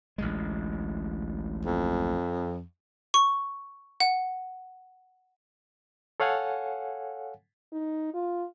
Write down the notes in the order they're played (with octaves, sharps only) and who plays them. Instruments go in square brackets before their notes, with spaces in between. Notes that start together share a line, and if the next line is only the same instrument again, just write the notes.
[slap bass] A1 D2 G#3
[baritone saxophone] F2
[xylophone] C#6
F#5
[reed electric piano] A4 C#5 F5 F#5 G#5
[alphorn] D#4
F4